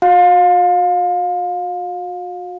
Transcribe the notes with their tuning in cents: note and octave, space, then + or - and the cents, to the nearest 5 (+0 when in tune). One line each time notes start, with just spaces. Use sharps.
F#4 -35 F5 +30